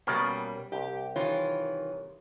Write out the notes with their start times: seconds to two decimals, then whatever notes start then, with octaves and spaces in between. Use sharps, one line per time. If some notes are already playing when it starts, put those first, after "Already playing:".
0.07 B2 G3 A#3 B3 C#4 A#4
0.72 C2 G4
1.16 D#3 E3 F4 C#5